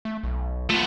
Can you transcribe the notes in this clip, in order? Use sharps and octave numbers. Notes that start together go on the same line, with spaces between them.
A3
B1
A3 B3 F4